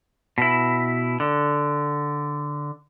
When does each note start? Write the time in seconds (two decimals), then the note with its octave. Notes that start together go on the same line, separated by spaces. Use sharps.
0.38 B2 E4
1.20 D3